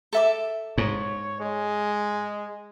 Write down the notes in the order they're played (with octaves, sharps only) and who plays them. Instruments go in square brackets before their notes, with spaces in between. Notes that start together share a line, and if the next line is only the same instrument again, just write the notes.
[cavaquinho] A4 E5 D6
[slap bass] G#2 [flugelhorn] C#5
[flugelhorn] G#3